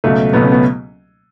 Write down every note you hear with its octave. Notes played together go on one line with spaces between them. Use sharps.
C#2 B2 F#3 A3
C#2 B2 F#3 B3
C#4
B3